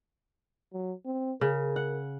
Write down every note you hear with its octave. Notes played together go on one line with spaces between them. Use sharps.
F#3
C4
C#3 A#4
F#5